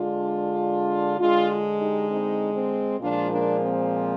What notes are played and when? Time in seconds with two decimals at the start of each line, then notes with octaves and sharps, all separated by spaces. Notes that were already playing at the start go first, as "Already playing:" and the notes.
Already playing: D3 G#3 D4 F4
1.19 D3 G#3 D4 F4
1.80 D#4 G4
2.09 C4 D#4
2.55 C4
3.00 A#2 F3 G#3 D4 F4
3.30 A#3 D4
3.61 C4